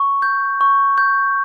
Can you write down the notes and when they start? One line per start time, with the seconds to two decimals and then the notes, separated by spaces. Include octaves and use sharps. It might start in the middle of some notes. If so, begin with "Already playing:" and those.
Already playing: C#6
0.22 G6
0.61 C#6
0.98 G6